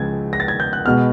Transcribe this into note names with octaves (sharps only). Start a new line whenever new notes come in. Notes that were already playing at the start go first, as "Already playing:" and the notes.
Already playing: C#2 C#3 F3 G#3 G#6 A6
A#6
A6
G#6
G6
F#6
B2 G#3 B3 F6